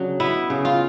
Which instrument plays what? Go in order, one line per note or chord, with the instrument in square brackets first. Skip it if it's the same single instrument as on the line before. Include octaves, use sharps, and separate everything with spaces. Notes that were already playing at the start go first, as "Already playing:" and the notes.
Already playing: [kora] C#3 F#3 D4
B3 E4
C#3
F4